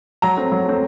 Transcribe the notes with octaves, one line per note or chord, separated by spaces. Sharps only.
F#3 A#5
A3 C4
F#3
A3 C4